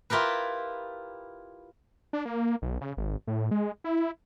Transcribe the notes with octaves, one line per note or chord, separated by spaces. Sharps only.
E4 F4 G4 A#4 B4
D4
A#3
B1
C#3
G#1
A2
G#3
E4